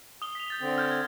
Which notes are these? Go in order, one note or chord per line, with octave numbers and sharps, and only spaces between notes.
D#6 G7
B6 F7
G6 A6 G7
D3 C4
F6 G6 G#6
G#6